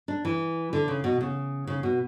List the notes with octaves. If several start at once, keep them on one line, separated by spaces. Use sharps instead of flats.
D4
E3
D3
C#3
B2
C#3
C#3
B2